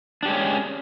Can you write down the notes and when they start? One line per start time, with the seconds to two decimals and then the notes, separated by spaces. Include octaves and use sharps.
0.23 D4
0.25 G4
0.28 G#3
0.31 C#4